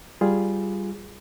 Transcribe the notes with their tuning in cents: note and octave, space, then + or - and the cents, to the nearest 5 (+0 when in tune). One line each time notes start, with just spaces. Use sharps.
G3 +0 F4 +0 G#4 +0